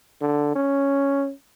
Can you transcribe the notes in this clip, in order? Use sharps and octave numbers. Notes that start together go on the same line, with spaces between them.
D3
C#4